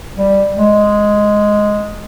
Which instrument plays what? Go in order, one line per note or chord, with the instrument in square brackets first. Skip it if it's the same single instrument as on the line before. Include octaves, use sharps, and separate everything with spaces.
[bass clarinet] G3
G#3